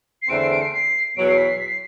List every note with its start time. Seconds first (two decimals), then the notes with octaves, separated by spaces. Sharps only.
0.22 C7
0.28 E2 D3 A3 C4 D7
0.39 C7
0.51 D7
0.61 C7
0.72 C7
1.16 E2 B2 F#3 D7
1.28 C7
1.38 B6
1.49 C7
1.60 B6
1.68 C7